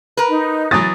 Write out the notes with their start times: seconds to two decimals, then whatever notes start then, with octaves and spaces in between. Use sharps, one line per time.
0.17 A#4 B4
0.29 D#4
0.71 E3 F#3 D#6 A6